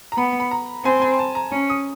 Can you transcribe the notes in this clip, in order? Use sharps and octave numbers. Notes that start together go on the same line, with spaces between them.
A#5
B3 B5
B5
A#5
C4 G#5
G#5
A5
A#5
C#4
D#6